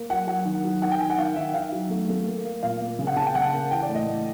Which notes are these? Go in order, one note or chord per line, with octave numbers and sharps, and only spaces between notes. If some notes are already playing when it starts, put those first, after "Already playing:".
Already playing: A#3
F#3 F#5
F#3 F#5
D#3
F#3
D#3 F#5
G5
D#3 G#5
F#5
D#3 F5
D#3 E5
D#3 F5
F#3
A3
A3
A#3
A#3
A#2 F5
A#3
C#3
F#5
C#3 A5
G5
C#3 F#5
A#3
E3 G5
D5
A2
D#5
A2